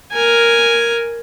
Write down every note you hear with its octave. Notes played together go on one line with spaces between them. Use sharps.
A#4 G#5